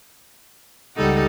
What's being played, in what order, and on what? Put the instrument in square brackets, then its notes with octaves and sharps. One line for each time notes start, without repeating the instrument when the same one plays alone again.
[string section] C#2 G3 F#5 [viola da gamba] D#4 A4